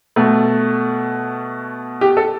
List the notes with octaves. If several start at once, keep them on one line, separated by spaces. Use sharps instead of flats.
B2 A3
G4
A4